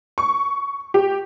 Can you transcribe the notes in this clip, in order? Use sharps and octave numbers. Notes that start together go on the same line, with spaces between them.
C#6
G4